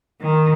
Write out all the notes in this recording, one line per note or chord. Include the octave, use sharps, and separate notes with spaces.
D#3